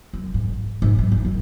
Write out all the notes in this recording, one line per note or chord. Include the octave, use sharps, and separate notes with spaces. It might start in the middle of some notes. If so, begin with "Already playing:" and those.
F#2
G#2
G#2
F#3
E2
D#3